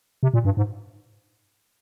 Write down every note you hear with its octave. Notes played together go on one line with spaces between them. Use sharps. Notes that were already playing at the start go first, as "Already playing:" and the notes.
C3
A#2
G2
G#2